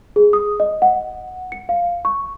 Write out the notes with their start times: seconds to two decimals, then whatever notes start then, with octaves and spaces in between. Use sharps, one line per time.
0.16 G#4
0.33 D#6
0.60 D#5
0.82 F#5
1.52 C#7
1.69 F5
2.05 C#6